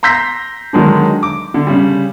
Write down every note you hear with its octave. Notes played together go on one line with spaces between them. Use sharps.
A#5 C6 E6 G6 A#6 B6
D3 D#3 F#3 G#3 D4
D6
D3
C#3 G3